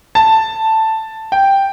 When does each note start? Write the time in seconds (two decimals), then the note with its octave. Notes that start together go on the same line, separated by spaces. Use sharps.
0.15 A5
1.32 G5